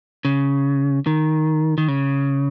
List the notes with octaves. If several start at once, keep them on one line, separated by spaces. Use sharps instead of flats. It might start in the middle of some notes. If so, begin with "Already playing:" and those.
C#3
D#3
D#3
C#3